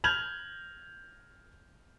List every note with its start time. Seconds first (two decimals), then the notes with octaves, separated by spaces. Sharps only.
0.04 F6 G6 G#6 F7 F#7